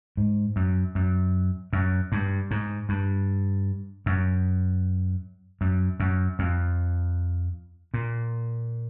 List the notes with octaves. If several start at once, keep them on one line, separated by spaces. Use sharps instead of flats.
G#2
F#2
F#2
F#2
G2
G#2
G2
F#2
F#2
F#2
F2
A#2